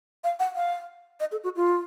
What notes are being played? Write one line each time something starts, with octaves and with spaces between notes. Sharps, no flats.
F5
F#5
F5
D#5
A4
F#4
F4